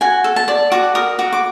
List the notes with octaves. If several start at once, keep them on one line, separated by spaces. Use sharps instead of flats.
F#4 G#5
A4
A5
D5
F#4 D6
A#4 D#6
F#4 D6
D6